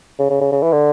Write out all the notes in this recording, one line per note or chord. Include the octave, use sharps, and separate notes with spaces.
C#3
C#3
C#3
C#3
E3
D3